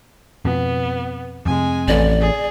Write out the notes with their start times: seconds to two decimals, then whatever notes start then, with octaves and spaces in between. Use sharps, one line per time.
0.45 F2 B2 B3
1.46 F2 C3 G#3 G#5
1.88 A1 D5
2.21 G#4